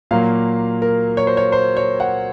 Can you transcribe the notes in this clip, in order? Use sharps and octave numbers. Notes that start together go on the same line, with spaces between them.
A#2 F#3 A#3 F5
A#4
C#5
C5
C#5
C5
C#5
F#5